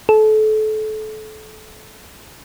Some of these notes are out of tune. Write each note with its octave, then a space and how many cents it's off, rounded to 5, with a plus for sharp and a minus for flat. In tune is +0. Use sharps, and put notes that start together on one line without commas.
A4 -30